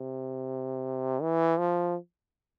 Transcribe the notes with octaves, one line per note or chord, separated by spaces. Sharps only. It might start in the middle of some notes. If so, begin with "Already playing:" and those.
Already playing: C3
E3
F3